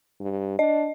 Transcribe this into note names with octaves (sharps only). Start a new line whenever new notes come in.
G2
D4 D#5